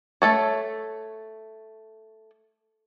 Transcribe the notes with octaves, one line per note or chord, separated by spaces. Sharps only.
A3 A4 C#5